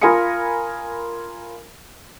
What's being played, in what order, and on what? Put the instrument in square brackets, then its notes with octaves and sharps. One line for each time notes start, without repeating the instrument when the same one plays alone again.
[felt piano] F4 A#4 G#5 B5 D#6 C#7